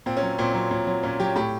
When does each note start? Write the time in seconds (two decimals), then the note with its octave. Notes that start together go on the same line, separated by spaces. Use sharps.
0.06 A#2 C4
0.17 C#4
0.23 F#3
0.38 A#2 C4
0.55 F#3
0.71 A#2
0.87 F#3
1.03 A#2 C#4
1.20 F#3 G4
1.36 A2 G4